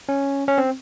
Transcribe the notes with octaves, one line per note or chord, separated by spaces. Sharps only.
C#4
C#4
C4